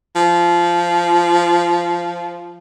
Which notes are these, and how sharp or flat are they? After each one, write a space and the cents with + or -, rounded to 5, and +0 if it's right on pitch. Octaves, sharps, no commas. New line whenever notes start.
F3 -10